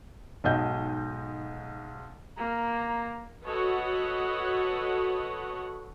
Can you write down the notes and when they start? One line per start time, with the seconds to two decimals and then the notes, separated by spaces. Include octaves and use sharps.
0.44 B1 G#2 D#5 G6
2.37 A#3 A#5
3.45 F#4 A4 B4 C#5 D#5 F#5